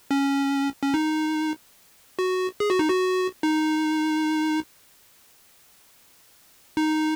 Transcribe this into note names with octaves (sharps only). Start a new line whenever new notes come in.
C#4
C#4
D#4
F#4
G#4
F#4
D#4
F#4
D#4
D#4